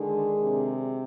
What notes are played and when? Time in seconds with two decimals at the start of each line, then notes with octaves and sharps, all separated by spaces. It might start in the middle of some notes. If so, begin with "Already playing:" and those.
Already playing: D3 D#3 G#3 D4 G#4
0.43 C3